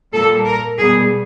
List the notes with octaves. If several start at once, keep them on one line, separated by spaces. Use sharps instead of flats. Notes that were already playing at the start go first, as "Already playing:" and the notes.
A#2 G3 A#3 A4
A#4
B2 G3 B3 G#4